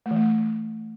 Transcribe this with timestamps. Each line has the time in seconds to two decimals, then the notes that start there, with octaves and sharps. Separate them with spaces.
0.06 A3
0.11 E3
0.16 A3